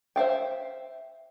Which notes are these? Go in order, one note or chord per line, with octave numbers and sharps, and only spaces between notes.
C5 E5 F5 G5